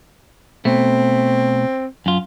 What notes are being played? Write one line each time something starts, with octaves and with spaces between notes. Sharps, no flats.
B2 A3 C4
F#2 F4